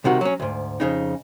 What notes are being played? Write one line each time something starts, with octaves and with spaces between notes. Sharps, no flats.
C2 C3 D#3 F#4
F#3 C#4
D2 G#2
F2 C#3 D#4